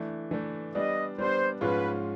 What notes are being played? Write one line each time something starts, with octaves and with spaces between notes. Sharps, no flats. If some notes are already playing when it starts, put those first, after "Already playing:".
Already playing: E3 A3 D4
E3 A3 D4
G3 B3 D4 D#5
G3 B3 D4 C5
G#2 F3 G#3 C#4 F4 B4